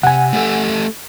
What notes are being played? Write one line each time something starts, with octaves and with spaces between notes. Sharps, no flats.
C3 F#5 G#5
A3 G4 A4